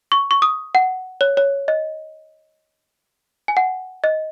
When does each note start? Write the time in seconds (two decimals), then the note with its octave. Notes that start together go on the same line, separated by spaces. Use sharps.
0.12 C#6
0.31 C#6
0.42 D#6
0.75 F#5
1.21 C#5
1.37 C#5
1.68 D#5
3.48 G#5
3.57 F#5
4.04 D#5